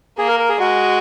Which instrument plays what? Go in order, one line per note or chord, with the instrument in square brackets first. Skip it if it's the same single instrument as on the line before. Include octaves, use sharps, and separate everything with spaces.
[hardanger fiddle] A#3 [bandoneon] G#4
[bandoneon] A#4
A#4
G#4
[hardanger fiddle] G#3 [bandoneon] F#4